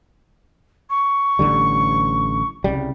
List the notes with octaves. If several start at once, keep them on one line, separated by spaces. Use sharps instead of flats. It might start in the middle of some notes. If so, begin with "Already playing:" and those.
C#6
A1 D3 G3
C2 C#3 G3